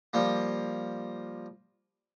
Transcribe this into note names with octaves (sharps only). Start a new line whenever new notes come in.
F3 G3 A#3